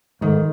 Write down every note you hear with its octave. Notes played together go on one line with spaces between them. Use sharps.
G#2 D#3